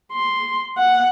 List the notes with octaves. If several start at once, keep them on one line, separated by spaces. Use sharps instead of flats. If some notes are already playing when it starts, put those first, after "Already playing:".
C6
F#5